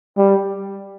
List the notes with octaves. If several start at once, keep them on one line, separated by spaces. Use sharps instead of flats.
G3